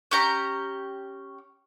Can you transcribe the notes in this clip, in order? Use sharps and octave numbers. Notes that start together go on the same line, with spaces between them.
C#4 G4 A#5